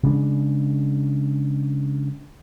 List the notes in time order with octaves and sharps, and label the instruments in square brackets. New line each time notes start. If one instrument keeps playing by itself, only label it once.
[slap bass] C#3 G#3 D4